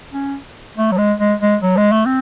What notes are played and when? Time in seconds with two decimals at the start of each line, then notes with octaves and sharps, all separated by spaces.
0.13 C#4
0.77 A3
0.92 F#3
0.98 G#3
1.19 G#3
1.41 G#3
1.62 F#3
1.77 G#3
1.92 A3
2.06 C4